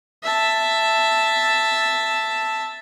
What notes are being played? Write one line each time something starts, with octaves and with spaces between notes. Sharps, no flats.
E5 A5